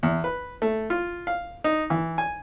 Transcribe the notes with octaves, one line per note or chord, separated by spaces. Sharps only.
E2
B4
A3
F4
F5
D#4
E3
G#5